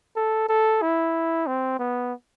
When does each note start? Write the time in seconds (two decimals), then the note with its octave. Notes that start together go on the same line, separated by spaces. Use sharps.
0.16 A4
0.49 A4
0.82 E4
1.47 C4
1.79 B3